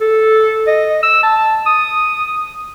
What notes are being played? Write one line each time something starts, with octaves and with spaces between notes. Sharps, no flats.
A4
D#5
E6
A5
D#6